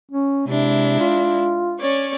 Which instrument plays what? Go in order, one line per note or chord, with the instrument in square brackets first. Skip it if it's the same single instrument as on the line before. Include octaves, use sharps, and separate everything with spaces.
[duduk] C#4
[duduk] C3 [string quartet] G#3 D4 E4
[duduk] F4
[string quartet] C#4 C#5 D5